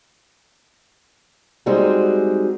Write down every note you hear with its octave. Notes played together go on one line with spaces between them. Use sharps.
G3 G#3 C4 D#4 F#4 G#4